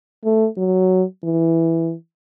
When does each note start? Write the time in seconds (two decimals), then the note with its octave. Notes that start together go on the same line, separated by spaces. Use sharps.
0.25 A3
0.57 F#3
1.24 E3